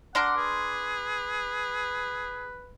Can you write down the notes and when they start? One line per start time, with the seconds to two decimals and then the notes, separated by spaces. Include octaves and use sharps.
0.15 D4 A#4 F#5 C6 D6
0.37 G#4 B4